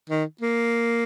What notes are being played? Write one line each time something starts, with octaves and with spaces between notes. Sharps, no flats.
D#3
A#3